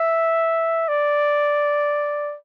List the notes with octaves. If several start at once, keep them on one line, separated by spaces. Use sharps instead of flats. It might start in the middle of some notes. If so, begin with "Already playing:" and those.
Already playing: E5
D5